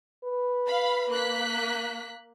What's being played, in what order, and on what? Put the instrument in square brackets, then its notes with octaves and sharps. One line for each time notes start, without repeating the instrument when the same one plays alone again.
[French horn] B4
[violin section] F5 B5
A#3 F#6 B6